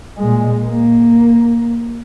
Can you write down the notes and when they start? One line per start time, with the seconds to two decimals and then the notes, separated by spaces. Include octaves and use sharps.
0.18 A#2 G#3
0.66 A#3